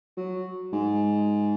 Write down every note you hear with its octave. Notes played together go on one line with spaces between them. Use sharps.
F#3
G#2